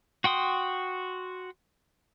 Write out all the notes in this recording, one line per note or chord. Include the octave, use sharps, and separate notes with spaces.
F#4 G5 C6 D#6